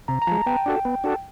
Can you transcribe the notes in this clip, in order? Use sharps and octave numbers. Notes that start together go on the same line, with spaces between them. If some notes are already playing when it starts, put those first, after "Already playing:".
C3 A#5
A#5
F3 G#3 A5
B3 G5
D4 F#4 A4
B3
D4 F#4 A4